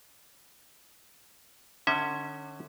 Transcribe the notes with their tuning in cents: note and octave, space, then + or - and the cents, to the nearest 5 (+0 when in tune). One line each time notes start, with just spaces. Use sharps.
D3 +25 C#4 +0 E5 -30